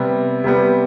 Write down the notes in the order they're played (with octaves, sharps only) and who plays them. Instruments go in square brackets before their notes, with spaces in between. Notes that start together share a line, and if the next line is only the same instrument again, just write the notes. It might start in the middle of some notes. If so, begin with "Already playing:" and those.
Already playing: [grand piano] C3 G3 B3
C3 G3 B3